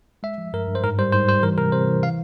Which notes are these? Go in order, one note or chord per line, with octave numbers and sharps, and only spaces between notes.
G#3 E5
F3
G2 A#4
G2
C5
G#2 A#4
G3 C5
G#2 C5
G3 C5
E3 A#4
C3 A#4
C3 C5
E3
F5